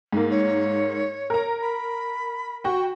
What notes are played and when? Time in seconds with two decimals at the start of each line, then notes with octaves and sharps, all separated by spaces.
0.13 G#2 A#3
0.30 C#5
1.30 A#4 A#5
1.61 B5
2.64 F#4 G5 C#6